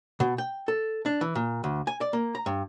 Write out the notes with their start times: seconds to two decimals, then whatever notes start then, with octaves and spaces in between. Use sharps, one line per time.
0.20 B2
0.38 G5
0.68 A4
1.06 D4
1.21 E3
1.35 A#2
1.64 D2
1.87 G#5
2.01 D5
2.13 A#3
2.35 A#5
2.46 G2